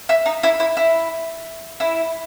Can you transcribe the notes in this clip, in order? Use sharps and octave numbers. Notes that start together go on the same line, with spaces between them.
E4
D#4
E4
E4
E4
E4